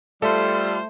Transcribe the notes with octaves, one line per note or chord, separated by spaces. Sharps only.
G3 A3 F4 A4 C5